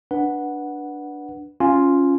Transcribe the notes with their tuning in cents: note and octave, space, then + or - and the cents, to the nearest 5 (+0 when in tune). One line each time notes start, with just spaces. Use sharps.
D4 +0 B4 -15 F#5 +0
C#4 +0 F4 +0 G#5 +0